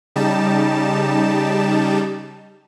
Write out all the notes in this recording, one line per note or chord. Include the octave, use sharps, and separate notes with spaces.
C#3 G3 D#4 G4 A5 E7